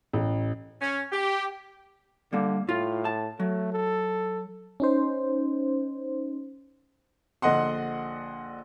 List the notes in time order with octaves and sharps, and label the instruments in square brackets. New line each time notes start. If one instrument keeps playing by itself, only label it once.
[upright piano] A1
[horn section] C#4
G4
[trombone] D3 [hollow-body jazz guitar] G3 A#3
[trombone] A2 [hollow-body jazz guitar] F4
[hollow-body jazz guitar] A5
[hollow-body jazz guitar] F#3 [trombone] A3
[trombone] A4
[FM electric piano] C#4 D#4 C5
[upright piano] A#1 D3 D#5 F#5 C6